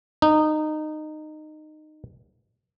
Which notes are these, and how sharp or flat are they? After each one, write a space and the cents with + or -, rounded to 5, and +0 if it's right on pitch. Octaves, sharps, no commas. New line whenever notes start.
D#4 -20